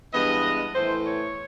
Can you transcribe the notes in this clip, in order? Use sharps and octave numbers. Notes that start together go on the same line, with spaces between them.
G2 E3 G#3 B3 D#5
A2 E3 A3 C5
C#5